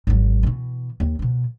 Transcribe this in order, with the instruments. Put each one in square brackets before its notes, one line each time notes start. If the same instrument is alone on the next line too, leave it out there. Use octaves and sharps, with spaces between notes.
[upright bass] G#1 F#3
B2 E3
D#2
B2 F3